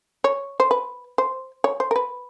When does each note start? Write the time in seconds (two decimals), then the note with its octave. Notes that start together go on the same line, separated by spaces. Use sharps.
0.24 C#5
0.60 C5
0.71 B4
1.18 C5
1.64 C#5
1.80 C5
1.91 A#4
1.96 B4